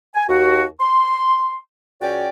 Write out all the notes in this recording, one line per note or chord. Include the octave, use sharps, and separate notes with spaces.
G#5
D#2 F#4
C6
C#2 C#4 F#4 C#5 D5 G5